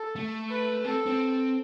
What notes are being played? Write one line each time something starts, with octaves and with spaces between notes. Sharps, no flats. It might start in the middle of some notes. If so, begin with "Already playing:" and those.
Already playing: A4
A3
B4
C4 A4
C4